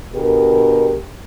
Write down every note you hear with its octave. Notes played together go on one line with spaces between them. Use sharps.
B2 D3 G4 G#4 A#4